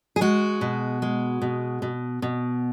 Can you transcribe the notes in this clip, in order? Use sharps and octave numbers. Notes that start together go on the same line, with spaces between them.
G#4
G#3 F#4
B2
G#3
B2
B2
B2